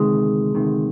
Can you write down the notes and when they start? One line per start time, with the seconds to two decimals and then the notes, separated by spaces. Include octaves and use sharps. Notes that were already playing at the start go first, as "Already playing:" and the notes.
Already playing: D2 C3 D#3 G#3
0.55 D2 C3 D#3